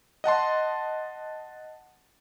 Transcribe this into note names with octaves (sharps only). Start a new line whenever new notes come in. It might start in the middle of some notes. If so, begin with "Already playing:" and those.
D#5 F#5 A5 C6